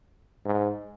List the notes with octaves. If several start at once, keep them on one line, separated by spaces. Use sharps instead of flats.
G#2